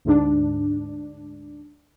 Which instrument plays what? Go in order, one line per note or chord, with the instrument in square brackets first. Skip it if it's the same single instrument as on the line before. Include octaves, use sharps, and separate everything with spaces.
[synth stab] D2 G#2 D4